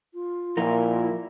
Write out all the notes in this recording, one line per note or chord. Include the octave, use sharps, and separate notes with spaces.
F4
A#2 F3 E4 A#4